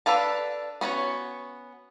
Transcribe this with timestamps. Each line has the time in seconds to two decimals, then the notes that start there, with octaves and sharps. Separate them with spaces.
0.06 D4 A4 B4 F5 A5
0.81 B3 C#4 F#4 C#5